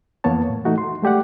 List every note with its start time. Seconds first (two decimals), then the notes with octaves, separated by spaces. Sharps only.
0.24 F2 E3 A#3 B3 C#5 A5
0.50 A2
0.65 E3 A3 D#4 F#4
0.78 C6
1.02 G#3 A3 G4 D5 F#5